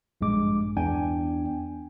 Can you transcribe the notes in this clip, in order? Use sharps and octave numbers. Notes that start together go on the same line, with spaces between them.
A#1 G2 G#3 D6
E2 D4 G5 G#5